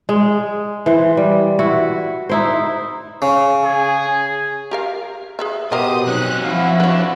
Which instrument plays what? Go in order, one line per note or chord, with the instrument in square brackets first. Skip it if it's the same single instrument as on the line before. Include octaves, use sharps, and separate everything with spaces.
[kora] G#3
E3 C5
G3
E4 F#4
D#4 E4 C5
[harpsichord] C#3
[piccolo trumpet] G#4
[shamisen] G4 A#4 F5
G#4 B4 E5
[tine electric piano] B2 B3 G4 [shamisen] A#4 D#5 [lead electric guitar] C5 [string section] D#6
[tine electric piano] F#3 D#4 [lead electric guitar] C4 C#5 [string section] F#6
[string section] F3 E4 F#4 [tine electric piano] F5
[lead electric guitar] D4 [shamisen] B4 C#5